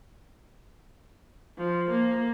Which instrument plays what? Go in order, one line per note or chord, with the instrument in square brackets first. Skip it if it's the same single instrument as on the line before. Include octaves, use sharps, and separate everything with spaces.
[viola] F3
A#3